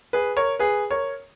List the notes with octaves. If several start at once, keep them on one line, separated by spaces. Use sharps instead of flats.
G#4 B4
A#4 C#5
G#4 B4
A#4 C#5